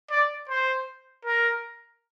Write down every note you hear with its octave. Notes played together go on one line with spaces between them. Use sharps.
D5
C5
A#4